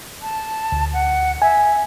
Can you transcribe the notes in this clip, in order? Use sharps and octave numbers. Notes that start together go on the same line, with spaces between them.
A5
D2
F#5
E5 G#5